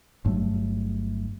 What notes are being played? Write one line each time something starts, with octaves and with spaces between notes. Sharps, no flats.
G1 G2 F#3 A3